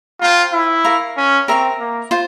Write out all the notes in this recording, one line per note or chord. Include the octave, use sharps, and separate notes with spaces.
F4 C5 G5 A#5
E4
A#4 F5 A#5 C#6
C#4
C4 A#4 E5 A#5 C#6
A#3
F4 C5